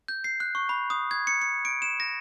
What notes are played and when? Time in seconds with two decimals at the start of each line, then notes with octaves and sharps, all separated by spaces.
0.08 G6
0.24 C7
0.40 F#6
0.55 C#6
0.69 B5
0.90 D#6
1.11 G#6
1.27 C#7
1.42 C#7
1.65 D7
1.82 E7
2.00 A#6